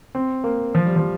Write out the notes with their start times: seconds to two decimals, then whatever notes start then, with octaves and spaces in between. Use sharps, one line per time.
0.15 C4
0.44 A#3
0.75 F3
0.85 G3
0.96 F3